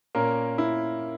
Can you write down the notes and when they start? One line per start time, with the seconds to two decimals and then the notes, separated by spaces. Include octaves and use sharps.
0.15 A#2 A#3 C#4 A#4
0.58 E4